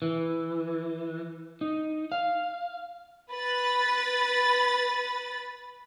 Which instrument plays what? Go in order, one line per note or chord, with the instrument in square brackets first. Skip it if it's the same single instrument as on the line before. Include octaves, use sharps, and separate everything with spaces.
[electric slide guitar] E3
D#4
F5
[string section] B4 B5 A6